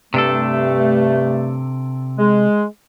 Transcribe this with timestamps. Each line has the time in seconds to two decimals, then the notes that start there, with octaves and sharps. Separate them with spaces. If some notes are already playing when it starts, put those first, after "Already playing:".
0.14 G2 C3 A3 D4 A4
2.19 G#3